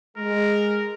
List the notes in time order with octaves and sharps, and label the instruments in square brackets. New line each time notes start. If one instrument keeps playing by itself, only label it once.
[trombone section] G#3 [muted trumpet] A#4